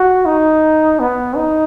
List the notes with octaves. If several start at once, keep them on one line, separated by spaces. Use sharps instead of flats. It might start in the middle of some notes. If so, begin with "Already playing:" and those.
Already playing: F#4
D#4
B3
D#4